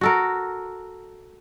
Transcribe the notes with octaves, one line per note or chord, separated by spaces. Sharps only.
F#4 A4 A#4